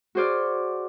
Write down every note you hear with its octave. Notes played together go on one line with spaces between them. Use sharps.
F#4 G#4 C5 D5 F6